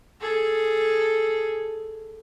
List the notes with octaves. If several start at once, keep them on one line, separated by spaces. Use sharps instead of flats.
G#4 A4